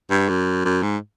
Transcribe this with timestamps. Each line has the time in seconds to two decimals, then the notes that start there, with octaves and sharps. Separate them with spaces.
0.10 G2
0.29 F#2
0.65 F#2
0.83 G#2